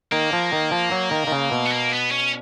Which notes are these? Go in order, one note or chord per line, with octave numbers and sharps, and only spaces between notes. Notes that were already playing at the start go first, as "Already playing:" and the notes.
D#3 A#3
F3
D#3
F3
F#3
D#3
D#3
C#3
B2
B3
A#3
B3
C#4